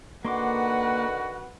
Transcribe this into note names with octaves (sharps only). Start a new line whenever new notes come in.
D3 D#3 A#3 F#4 B4 F#5 C6 D6